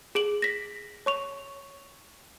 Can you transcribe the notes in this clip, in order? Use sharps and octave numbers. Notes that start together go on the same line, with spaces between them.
G#4 D7 F#7
A#6 B6
C#5 C#6 F7